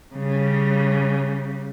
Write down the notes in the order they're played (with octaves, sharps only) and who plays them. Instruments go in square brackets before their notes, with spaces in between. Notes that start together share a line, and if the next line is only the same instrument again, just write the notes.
[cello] C#3 G3